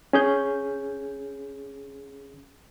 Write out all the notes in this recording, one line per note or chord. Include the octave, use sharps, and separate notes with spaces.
C#4 G#4 G6